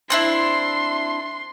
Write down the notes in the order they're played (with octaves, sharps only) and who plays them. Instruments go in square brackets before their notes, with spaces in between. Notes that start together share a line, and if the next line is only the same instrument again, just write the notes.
[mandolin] C4 D4 E4 [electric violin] C6